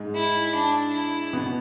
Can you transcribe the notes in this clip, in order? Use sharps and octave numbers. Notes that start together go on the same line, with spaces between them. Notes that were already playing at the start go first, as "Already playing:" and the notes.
Already playing: G#2 G#3
E4
D4
E4
B2 B3